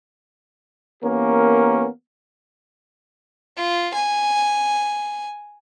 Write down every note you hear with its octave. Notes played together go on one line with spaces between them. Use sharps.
E3 A#3 B3 C#4 G4 A#4
F4
G#5